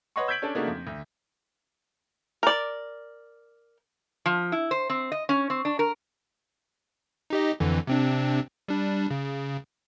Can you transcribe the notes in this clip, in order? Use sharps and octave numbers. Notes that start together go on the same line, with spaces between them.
B4 C#5 D#5 F#5 C6 C#6
E6 G6 G#6 B6 D7 F#7
C#4 D4 A4
C#3 A3 A#3 D4 D#4 F#4
F2
D2
A#4 D5
F3
E4
C5
C4
D#5
C#4
C4
D4
A#4
D#4 G4 D#5
F2 D3 E3
C3 C4 D4
G3 D4
C#3